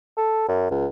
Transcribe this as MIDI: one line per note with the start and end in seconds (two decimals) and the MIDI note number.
0.17 0.46 69
0.49 0.68 42
0.71 0.86 37